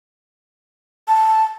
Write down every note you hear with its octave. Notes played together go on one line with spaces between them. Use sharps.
A5